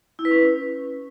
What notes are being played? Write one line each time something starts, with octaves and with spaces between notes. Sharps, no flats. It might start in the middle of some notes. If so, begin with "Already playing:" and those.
E4
B4
C#4